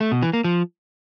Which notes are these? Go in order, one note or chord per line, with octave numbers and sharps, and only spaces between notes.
A3
B2
E3
A#3
F3